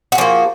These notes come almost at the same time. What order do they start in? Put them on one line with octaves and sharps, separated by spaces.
F#4 G#4 F3 A#3